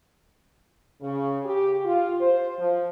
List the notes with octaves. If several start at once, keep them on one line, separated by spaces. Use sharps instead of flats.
C#3
G4
F4
C5
F3